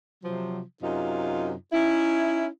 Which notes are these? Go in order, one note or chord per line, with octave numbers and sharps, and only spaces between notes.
C3 F3 F#3
F#2 C3 D#4 F4
C#4 D#4 E4